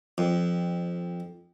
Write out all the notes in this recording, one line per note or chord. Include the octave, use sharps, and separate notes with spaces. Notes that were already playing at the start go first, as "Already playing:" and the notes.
F2